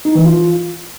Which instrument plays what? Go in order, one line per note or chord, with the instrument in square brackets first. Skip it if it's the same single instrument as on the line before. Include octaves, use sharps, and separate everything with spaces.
[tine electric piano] D#4
E3
F4